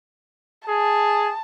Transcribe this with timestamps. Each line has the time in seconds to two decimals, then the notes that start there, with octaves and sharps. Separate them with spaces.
0.68 G#4 A5